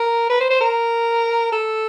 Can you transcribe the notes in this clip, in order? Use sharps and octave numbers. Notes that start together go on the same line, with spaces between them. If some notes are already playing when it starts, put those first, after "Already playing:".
Already playing: A#4
B4
C5
C5
A#4
A4